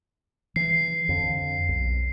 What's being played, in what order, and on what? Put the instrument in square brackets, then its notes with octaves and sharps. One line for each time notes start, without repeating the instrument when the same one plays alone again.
[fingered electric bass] E3 [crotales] C7
[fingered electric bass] F2 D3
B1